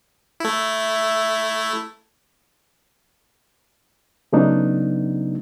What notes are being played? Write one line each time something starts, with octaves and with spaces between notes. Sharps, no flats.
A3 E4
C#3 F#3 A3 B3 D4 D#4